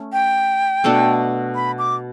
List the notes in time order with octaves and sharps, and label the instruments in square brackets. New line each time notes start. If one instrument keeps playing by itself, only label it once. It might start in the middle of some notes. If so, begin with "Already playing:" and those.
Already playing: [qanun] A3 C#4
[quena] G5
[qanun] B2 A3 D4 A4
[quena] B5
D6